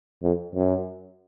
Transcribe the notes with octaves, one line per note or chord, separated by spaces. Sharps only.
F2
F#2